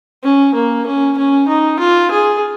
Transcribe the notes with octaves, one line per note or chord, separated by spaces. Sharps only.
C#4
A#3
C#4
C#4
D#4
F4
G#4